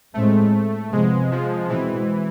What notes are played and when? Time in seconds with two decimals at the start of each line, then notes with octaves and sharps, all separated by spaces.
0.14 A2 G#3 A3 C4
0.92 F2 C3 F3 G#3 B3
1.31 F3
1.69 B2 E3 G#3 C4